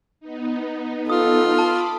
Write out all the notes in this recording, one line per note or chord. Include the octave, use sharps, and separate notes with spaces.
B3 D#4
F4 A4 D#6
A5 B5 D6